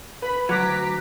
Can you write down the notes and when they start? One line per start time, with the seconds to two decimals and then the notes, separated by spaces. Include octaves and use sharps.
0.22 B4 B5
0.49 D2 F#3 A#5 D6 F#6 B6